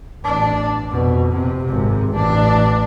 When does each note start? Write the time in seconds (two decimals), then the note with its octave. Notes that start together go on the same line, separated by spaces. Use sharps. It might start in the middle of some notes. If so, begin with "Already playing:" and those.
0.23 A1 D4
0.90 F2 B2
1.32 C3
1.64 G#1 C3
2.12 A1 D4